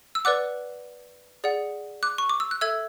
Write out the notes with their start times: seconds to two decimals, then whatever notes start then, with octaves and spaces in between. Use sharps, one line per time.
0.15 E6
0.25 B4 D5 F#5 D6 F#6
1.44 G#4 D5 F#5
2.03 D6 F#6
2.18 C#6
2.29 D6
2.40 E6
2.51 F#6
2.61 A4 E5 E6 G#6